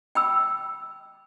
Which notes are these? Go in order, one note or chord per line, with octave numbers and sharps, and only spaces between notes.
G5 B5 E6